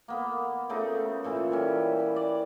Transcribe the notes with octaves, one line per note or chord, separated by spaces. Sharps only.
A#3 B3
C#3 A3 D#4
A#2 E3 A4
G3 C#4
B4
D5